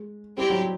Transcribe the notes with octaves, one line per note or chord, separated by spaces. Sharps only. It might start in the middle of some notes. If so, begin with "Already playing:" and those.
Already playing: G#3
G3 C4 E4 G4
F#3